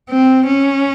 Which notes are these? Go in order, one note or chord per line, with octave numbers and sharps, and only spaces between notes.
C4
C#4